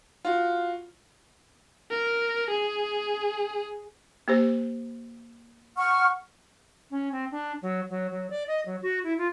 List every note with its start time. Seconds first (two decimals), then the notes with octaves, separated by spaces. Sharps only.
0.25 F4 F#4
1.91 A#4
2.50 G#4
4.28 A#3 G4 C5
5.77 F#5 C#6 F6
6.91 C#4
7.12 C4
7.31 D4
7.62 F#3
7.90 F#3
8.11 F#3
8.30 D5
8.48 D#5
8.66 F#3
8.82 F#4
9.04 E4
9.18 F4